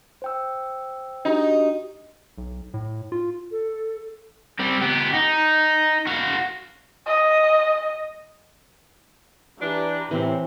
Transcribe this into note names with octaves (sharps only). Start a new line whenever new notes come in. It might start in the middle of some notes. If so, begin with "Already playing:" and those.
C5 G5 E6
D4 D#4 F#4 G4
B1
A2
F4
A4
G3 C4
B3 G4
D#4
F#4 F5
D#5
E3 D4 G4 B4 A#5
A2 C3 E3 C4